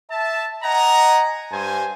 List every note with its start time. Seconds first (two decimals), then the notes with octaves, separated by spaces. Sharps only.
0.11 E5 A5
0.63 D#5 F#5 G#5 A#5
1.52 G2 C5 G#5